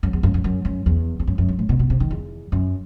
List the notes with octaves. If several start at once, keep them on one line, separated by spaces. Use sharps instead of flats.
F#2
E2
F#2
F#2
F#2
F#2
E2
E2
F#2
F#2
G2
A2
B2
B2
C3
D#3
E2
F#2